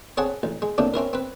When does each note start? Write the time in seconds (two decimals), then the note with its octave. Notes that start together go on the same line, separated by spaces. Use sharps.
0.17 C4 G#4 A4 C#5 F#5 A5
0.43 A1
0.62 G#3
0.78 A2 C3 A#3 D4
0.94 C4 C#4 E4 A#4
1.13 C4 B4